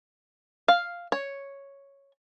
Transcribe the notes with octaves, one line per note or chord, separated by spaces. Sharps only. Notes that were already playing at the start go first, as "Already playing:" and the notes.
F5
C#5